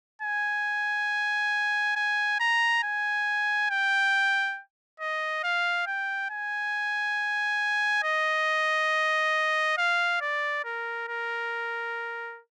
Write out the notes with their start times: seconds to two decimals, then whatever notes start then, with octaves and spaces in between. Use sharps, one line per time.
0.22 G#5
1.96 G#5
2.40 A#5
2.83 G#5
3.70 G5
5.00 D#5
5.44 F5
5.87 G5
6.30 G#5
8.04 D#5
9.78 F5
10.21 D5
10.64 A#4
11.08 A#4